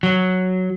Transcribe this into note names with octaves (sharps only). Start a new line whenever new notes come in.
F#3